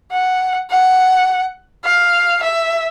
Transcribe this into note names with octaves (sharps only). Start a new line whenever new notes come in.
F#5
F#5
F5
E5